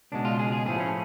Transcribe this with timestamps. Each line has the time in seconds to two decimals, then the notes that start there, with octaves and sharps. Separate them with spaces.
0.12 C#2 B2 G#3 D4
0.25 F4
0.39 G#4
0.52 G#4
0.65 A2 F3 A3 G#4
0.80 C#4